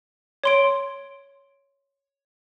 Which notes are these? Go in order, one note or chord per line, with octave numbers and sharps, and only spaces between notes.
C#5 C6 D7